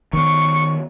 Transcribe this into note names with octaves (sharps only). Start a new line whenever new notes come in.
D#3 B3 C#6